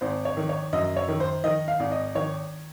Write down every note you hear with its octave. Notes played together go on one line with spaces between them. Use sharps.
G#1 C5
C#5
D#3
C#5
F#2 D#5
C#5
D#3
C5
D#3 D#5
F5
G#1
D#5
D#3 C#5